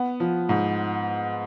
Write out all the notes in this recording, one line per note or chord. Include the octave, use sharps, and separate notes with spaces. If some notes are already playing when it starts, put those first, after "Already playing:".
Already playing: B3
F3
G#2